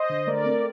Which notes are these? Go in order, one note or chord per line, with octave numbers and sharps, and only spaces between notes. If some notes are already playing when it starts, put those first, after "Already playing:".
Already playing: C5 D#5
D3
A3 A#4 D5
C4